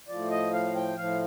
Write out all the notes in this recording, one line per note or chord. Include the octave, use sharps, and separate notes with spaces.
A2 F3 D5
D#5
F5
G5
A2 F3 F5